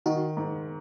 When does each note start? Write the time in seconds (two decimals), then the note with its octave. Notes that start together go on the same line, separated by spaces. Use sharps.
0.06 D#3 D#4 F#4
0.37 G#2